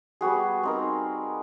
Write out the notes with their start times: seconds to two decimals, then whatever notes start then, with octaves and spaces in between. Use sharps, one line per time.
0.21 G3 B3 F#4 G#4
0.63 C4 D#4 A#4